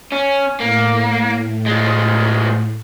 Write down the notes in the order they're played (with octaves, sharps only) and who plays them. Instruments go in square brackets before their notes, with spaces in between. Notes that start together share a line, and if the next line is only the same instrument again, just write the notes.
[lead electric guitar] C#4
[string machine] A2 [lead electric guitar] A#3
[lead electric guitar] F3 G#3